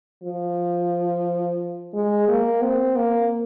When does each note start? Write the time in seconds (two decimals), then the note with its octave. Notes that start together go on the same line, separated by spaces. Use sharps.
0.24 F3
1.94 G#3
2.28 A#3
2.62 C4
2.96 A#3